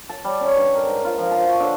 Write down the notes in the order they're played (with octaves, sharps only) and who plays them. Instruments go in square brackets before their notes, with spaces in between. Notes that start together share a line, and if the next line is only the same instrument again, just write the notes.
[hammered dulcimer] A5
G3
C#4
G2
A#4
G#2
F4
F3
A5
F#4
D3